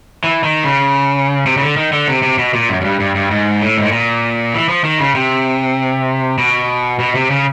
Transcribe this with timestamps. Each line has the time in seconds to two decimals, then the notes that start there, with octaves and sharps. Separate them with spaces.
0.24 E3
0.44 D#3
0.64 C#3
1.46 C3
1.57 C#3
1.62 D3
1.77 D#3
1.92 D3
2.08 C3
2.23 C3
2.39 B2
2.54 A#2
2.69 F#2
2.81 F#2
2.85 G2
3.00 G2
3.15 G2
3.31 G#2
3.62 A2
3.77 G#2
3.84 A2
3.92 A#2
4.54 E3
4.69 F3
4.84 D#3
5.00 C#3
5.15 C3
6.38 B2
7.00 B2
7.15 C3
7.30 C#3